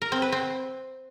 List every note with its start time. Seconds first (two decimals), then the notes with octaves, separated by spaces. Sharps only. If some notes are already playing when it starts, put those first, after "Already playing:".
0.02 A#4
0.12 C4
0.22 B4
0.32 C4